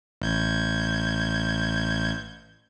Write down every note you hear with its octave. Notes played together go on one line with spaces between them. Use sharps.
A1 G6 G#6